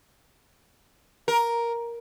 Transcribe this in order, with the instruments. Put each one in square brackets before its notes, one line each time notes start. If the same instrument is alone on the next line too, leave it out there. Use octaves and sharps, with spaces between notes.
[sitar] A#4